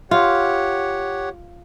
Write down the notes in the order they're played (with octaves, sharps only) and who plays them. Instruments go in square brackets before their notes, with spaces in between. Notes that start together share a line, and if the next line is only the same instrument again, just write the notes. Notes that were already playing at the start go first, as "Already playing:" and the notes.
[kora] F4 [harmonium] G4 C#5 F#5